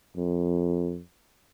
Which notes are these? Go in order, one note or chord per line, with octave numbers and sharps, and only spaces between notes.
F2